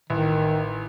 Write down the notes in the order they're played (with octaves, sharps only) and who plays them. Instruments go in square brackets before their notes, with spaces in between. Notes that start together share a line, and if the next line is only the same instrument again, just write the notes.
[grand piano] A1 [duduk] D#3